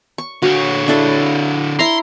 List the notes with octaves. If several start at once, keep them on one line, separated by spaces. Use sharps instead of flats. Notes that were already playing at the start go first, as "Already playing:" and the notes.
C#6
D3 F#4 C#5
D4 E4 A4
E4 A#5 C6